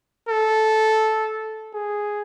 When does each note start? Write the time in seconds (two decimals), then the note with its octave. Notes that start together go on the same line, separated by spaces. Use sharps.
0.29 A4
1.74 G#4